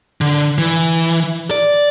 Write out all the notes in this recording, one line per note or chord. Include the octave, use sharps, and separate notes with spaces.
D3
E3
D5